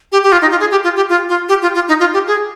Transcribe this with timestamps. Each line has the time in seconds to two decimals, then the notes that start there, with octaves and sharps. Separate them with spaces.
0.12 G4
0.23 G4
0.32 F4
0.42 D#4
0.51 F4
0.60 G#4
0.71 G4
0.84 F4
0.96 G4
1.09 F4
1.29 F4
1.49 G4
1.62 F4
1.75 F4
1.88 D#4
2.00 F4
2.14 G4
2.27 G#4